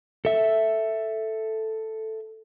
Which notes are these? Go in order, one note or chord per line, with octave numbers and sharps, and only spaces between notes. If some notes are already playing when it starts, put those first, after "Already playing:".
A4 E5